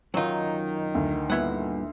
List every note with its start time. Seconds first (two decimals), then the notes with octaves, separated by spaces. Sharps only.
0.14 F#2 D#3 F#3 D#4 F4
0.95 D2
1.30 G2 A#2 B3 E4 F#5